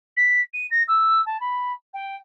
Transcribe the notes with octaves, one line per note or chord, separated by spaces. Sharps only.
B6
D#7
A#6
E6
A5
B5
G5